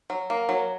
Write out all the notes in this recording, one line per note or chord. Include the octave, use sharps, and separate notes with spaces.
F#3
A#3
F#3